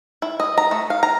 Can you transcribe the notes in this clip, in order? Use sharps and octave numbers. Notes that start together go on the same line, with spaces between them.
E4
D#5
A#5
A3
F5
A#5